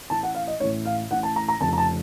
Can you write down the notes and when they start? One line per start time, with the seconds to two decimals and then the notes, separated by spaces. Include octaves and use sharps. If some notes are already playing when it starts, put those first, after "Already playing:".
0.10 A1 A2 A5
0.23 F#5
0.35 F5
0.48 D#5
0.60 A1 A2 C#5
0.85 F5
1.11 A1 A2 F#5
1.23 A5
1.36 A#5
1.48 A#5
1.61 F1 F2 C#3 A5
1.73 A#5
1.78 A5